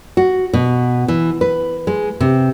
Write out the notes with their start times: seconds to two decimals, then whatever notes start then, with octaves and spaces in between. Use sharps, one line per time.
0.17 F#4
0.53 B2
1.08 E3
1.41 B4
1.87 G#3
2.20 C3